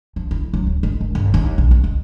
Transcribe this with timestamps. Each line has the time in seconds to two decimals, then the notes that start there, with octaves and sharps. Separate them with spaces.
0.16 F3
0.31 E4
0.54 F#3
0.67 D1
0.83 G#3
1.01 D#3
1.15 G1
1.34 D#2
1.58 A#1
1.71 D#3
1.84 D2